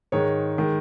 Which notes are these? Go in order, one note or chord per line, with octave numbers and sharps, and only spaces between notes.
G#2 D#3 G#3 C#5
D#3 G#3